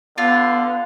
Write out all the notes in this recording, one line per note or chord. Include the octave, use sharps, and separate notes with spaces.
D3 B3 F4